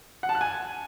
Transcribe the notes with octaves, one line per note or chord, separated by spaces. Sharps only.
F#5
A5
F#6
G#5